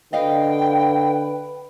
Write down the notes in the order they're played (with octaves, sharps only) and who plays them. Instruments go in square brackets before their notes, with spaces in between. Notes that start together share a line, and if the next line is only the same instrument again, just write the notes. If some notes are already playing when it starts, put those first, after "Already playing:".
[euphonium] D3 [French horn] B4 [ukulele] D#5 F5 [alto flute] G5